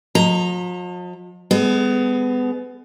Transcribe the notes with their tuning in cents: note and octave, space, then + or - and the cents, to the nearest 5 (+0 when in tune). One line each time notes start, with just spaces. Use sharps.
F3 +45 D#5 +0 A#5 +0
G#3 -45 B3 +25 G#4 +40